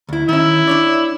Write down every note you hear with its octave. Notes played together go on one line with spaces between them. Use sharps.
D2 E4
D#3 C#4 E4
D4 C#5 D5